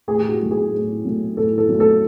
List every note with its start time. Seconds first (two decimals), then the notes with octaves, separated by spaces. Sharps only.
0.08 A2 G#4
0.19 G4
0.29 F#4
0.40 F#3 A3
0.51 G#4
0.72 A2
1.05 F#3 A3
1.37 A2 A4
1.58 A4
1.69 F#3
1.74 A3
1.80 A4